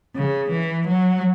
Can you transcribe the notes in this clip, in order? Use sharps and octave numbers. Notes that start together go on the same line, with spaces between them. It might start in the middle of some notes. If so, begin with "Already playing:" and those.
C#3
E3
F#3